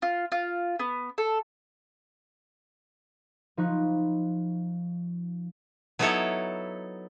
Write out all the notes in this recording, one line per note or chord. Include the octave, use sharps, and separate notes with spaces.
F4
F4
B3
A4
F3 D#4 B5 C#6 F#6
F#3 B3 D#4 E4 A4 C#5